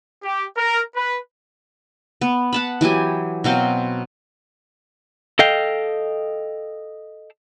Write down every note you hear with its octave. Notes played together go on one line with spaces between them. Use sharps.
G4
A#4
B4
B3
F#5 A5 B5
E3 F#3 G4 G#5
B2 F#3 C4 F5
A4 D#5 F5 G5